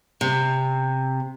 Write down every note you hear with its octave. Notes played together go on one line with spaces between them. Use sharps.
C3